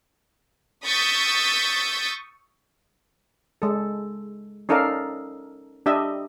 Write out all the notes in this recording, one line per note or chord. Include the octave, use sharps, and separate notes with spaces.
C#6 D#6 E6 G6 A6 B6
G#3 A4
C#4 D#4 A4 A#4 D5 F5
D4 G4 D#5 E5